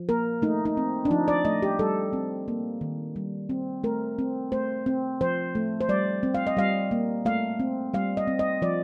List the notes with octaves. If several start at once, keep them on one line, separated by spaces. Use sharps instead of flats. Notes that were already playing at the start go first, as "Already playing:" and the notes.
Already playing: F3
A#3 A#4
A3 D#4
D#4
C4
D4
F3 D#4
D5
A3 D#5
G4
G3 A4
C4
A#3
D#3
G3
C4
A3 A#4
C4
A3 C5
C4
F3 C5
A3
C5
G3 D5
C4
F5
D#5
G3 F5
A#3
A3 F5
C4
G3 F5
D#5
C4
D#5
F3 D5